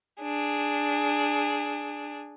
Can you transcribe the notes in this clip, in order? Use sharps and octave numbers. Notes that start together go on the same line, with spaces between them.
D4 G#4